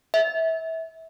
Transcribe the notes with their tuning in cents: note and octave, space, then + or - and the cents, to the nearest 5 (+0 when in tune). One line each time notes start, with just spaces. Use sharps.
E5 -25